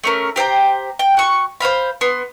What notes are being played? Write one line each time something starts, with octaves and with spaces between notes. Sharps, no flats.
A3 C#4 A#4
G4 C5 G5 A#5
G5
F#4 C#6
C5 D#5 F5 B5
B3 C6